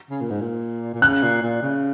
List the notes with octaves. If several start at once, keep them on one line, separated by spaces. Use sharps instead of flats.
C#3
A#2
G#2
A#2
A#2
C#3 F#6
A#2
A#2
C#3